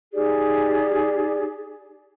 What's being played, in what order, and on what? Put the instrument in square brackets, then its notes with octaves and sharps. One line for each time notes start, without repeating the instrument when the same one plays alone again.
[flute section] D#4 G4 G#4 D5